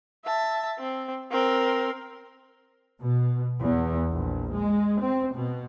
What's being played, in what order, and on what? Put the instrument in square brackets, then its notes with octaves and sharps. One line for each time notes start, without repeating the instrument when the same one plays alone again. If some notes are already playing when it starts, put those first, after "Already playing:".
[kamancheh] E5 A5
C4
C4 A#4
[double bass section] B2
E2
A#1
G#3
C4
B2